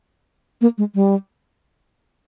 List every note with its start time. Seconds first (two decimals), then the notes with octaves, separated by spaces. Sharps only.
0.61 A#3
0.78 G#3
0.95 G3